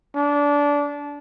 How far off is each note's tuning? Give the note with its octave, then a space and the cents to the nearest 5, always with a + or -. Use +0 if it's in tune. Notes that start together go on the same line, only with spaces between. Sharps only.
D4 -20